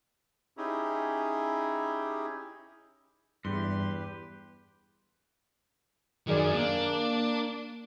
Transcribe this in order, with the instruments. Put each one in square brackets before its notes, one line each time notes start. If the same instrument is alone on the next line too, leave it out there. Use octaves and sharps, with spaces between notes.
[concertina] C#4 D#4 E4 G4 G#4
[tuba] E2 [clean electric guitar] G2 [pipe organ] G4 B4 [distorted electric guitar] C6
[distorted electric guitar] F#2 F#3 [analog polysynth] D#3 G#4 D5
[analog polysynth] A#3 [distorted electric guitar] D4